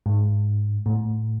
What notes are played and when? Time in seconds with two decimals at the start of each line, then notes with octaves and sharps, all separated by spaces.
0.06 G#2
0.86 A2